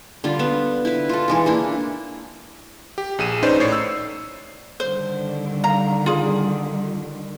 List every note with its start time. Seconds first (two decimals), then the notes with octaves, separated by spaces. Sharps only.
0.24 D3 G3 F4
0.39 B3
0.85 E4 B4
1.09 F4 A4
1.28 E3 G#3 A4
1.46 A#3 D4 E4
2.98 G4
3.19 A#1 G#4 D#7 E7
3.42 C#4 D#4 B4 C5 D5
3.60 A2 C#5 D5 C7
3.72 E6
4.80 D3 D#3 G3 C5
5.64 F5 A#5
6.06 F4 G#4